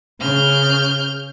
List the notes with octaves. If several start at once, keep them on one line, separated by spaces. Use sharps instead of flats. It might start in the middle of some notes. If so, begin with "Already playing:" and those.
C#3 F6 G6